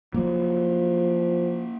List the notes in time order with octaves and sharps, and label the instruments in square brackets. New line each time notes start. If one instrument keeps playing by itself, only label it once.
[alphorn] F3 [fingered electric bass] F#3 A#3